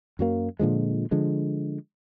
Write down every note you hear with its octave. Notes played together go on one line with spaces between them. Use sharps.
F#2 F#3 A#3
A#2 D3 F3 G#3
D3 F3 G#3